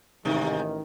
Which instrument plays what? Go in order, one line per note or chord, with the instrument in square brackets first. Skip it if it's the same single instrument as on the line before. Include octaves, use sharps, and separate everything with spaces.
[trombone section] A1 D#3 [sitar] G#2 C3